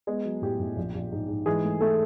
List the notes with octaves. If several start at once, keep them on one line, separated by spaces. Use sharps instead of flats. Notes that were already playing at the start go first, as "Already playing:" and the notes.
G#3 B3 G#4
F#3
A2 G4
A2
A#1
A#1
G#2
G#2
E3 G#3 G#4
A3
A3 A4